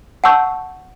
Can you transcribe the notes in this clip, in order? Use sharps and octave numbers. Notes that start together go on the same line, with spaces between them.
F#5 A5 C#6 E6 G6